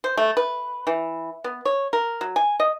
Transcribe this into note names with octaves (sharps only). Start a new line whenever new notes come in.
C5
A3
B4
E3
B3
C#5
A#4
F#3
G#5
D#5